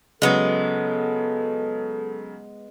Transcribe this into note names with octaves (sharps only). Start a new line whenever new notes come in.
C#3 F#3 G#3 B3 A4